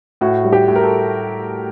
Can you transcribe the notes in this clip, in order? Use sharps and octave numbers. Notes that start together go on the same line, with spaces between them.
A2 F#4
G3
G4
A2
A#4
A4